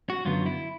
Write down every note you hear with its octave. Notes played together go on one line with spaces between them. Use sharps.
F#4
F#2 D3 F#3 B3 F4
E4